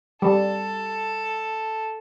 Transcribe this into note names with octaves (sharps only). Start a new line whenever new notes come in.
G3 A4